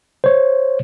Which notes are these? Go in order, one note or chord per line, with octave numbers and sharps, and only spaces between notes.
C5 C#5